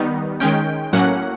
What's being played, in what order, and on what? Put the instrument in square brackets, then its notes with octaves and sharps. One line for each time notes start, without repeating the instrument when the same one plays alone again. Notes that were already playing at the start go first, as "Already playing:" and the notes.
Already playing: [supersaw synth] D#3 G3 B3 D#4
D#3 G#3 C#4 G5
A2 F#3 A#3 C#4 F#5